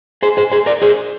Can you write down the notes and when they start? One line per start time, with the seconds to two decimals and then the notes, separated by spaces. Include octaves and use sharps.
0.22 G#4 C5
0.37 G#4 C5
0.52 G#4 C5
0.66 A#4 D5
0.82 G#4 C5